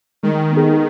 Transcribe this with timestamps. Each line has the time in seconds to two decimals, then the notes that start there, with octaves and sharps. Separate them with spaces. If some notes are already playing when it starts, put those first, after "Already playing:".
0.23 D#3 G#3
0.52 B3 D#4 G#4